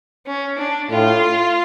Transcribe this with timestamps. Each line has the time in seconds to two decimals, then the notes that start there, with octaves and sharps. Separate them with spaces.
0.26 C#4
0.58 D4
0.90 A2 F4